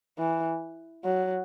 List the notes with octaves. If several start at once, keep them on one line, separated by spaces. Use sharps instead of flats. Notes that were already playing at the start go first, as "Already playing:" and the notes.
E3
F#3